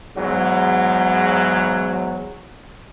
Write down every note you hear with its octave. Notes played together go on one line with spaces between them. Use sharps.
E2 G#2 F#3